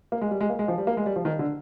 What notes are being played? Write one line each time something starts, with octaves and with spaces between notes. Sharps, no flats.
A#3
G#3
G3
G#3
A#3
G#3
F3
G3
A#3
G#3
G3
F3
D#3
D3